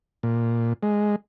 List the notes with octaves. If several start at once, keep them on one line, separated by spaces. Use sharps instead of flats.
A#2
G#3